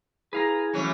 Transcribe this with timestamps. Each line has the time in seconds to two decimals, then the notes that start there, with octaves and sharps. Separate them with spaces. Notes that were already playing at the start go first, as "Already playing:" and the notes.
0.33 E4 G#4 B4 F5 A#5
0.73 C#3 E3 F#3 A3 C#4